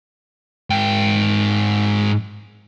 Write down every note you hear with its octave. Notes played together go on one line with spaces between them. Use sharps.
G#2 G5